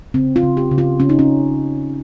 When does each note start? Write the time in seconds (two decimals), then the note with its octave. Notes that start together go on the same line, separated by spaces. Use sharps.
0.14 C#3 C4
0.36 F4
0.43 C#3
0.57 G4
0.71 C#3
0.78 F4
1.00 C#3 C#4
1.09 D#4
1.19 C#4